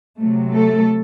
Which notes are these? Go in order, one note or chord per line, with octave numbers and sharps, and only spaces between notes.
C3 F#3 A3
A3 A4